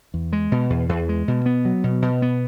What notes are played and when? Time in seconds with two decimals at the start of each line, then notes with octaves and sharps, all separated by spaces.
0.14 E2
0.33 G#3
0.52 B2
0.70 E2
0.89 E2
1.09 G#3
1.28 B2
1.46 B3
1.65 F#3
1.84 B2
2.02 B2
2.22 B3